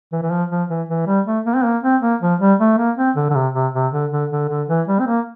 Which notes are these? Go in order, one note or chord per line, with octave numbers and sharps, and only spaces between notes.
E3
E3
F3
F3
E3
E3
G3
A3
A#3
C4
A#3
C4
A#3
F3
G3
A3
A#3
C4
D3
D3
C3
C3
C3
D3
D3
D3
D3
E3
G3
C4
A#3